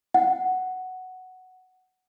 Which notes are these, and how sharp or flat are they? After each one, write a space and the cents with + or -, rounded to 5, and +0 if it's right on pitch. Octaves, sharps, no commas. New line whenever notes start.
F#5 +5